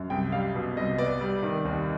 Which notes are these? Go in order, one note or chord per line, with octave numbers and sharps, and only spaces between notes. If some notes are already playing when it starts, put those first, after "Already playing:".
Already playing: F#2
C2 G5
G3 F5
B2
C2 D#5
B3 D5
G3
D#3
D#2